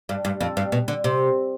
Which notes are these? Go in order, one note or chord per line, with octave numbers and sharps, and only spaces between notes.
G2
G2
F2
G2
B2
D3
C3